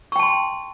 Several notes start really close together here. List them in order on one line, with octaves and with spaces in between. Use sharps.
C#6 G5 A5 C6